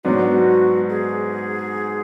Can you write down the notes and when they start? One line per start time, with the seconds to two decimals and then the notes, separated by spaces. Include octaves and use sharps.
0.04 G#2 F#3 B3 D4 F#4
0.89 G#4